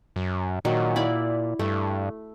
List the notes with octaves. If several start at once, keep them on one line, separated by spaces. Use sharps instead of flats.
F#2
A#2 D#3 F#3
E4 D5 B5
G2 A3